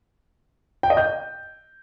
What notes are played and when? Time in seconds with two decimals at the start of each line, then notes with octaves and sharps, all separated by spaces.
0.83 G5
0.90 D#5
0.97 G6